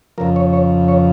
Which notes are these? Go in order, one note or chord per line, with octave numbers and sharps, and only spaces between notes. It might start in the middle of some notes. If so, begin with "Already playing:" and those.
F2 C#3 F3 A#4
C#5
C#5
C#5